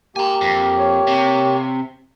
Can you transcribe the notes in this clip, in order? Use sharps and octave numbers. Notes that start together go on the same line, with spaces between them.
A#3 G4 G#5 A#5
F2
C#5
C3